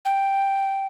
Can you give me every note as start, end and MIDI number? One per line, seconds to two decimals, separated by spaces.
0.05 0.86 79